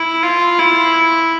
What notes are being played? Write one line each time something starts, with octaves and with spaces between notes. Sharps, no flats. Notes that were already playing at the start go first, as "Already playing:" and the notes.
Already playing: E4
F4
E4